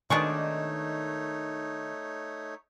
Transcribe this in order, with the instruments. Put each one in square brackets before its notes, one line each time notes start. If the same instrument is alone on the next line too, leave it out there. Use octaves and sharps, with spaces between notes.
[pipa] B2 G#3 C#6 [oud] D#3 D4 [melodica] A3 D#4 C#5